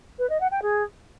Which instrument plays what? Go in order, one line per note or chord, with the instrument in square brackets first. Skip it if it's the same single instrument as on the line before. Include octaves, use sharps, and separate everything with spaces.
[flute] B4
D#5
F#5
G5
G#4